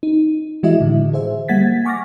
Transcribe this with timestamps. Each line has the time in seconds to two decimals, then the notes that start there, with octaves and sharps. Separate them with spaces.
0.03 D#4
0.63 E3 G#3 E4 F#4 D#5 E5
0.80 A2 D3
1.13 G#4 C5 E5
1.48 G3 A#3 F#5 G#6 A6 B6
1.85 G#5 C#6 D6 F6 A6 A#6